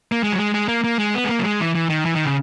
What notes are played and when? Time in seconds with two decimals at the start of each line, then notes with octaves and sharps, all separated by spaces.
0.12 A#3
0.23 G#3
0.32 F#3
0.38 G#3
0.54 G#3
0.68 A#3
0.84 A#3
0.99 G#3
1.14 B3
1.24 G#3
1.29 A#3
1.39 F#3
1.44 G#3
1.60 E3
1.75 E3
1.90 D#3
2.05 E3
2.16 D#3
2.25 C#3